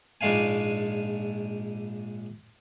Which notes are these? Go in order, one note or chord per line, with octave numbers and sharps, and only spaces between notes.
A#1 G#2 G#3 D4 F5 G#5